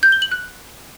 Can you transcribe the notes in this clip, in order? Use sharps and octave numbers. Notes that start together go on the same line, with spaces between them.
G6
G7
F#7
F#6